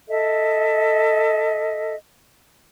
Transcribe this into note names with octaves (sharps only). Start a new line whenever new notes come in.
A4 D#5 E5